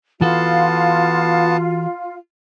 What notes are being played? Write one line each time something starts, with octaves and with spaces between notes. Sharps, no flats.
E3 B3 F4 F#4 A4 A5